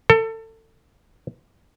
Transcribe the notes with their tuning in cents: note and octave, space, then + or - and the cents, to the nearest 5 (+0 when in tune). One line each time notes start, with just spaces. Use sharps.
A4 +25